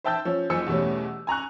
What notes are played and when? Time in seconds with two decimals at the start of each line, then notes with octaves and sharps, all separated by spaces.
0.04 C5 E5 G5 A5 E6 G6
0.25 F3 C#4
0.50 F#1 F3 C5 G#5 E6 C#7
0.66 E2 B2 E3 G3 A3 C#4
1.27 G#5 A#5 C#6 F#6